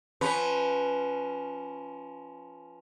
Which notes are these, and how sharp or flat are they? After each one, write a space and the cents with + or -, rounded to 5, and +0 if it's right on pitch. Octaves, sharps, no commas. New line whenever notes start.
F3 -5 C#4 +0 B4 +0